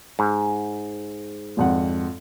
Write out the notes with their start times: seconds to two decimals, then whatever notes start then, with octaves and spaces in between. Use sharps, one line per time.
0.19 G#2
1.57 G#1 F2 F#5